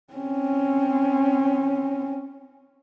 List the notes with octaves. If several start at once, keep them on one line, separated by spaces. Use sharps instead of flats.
C4 C#4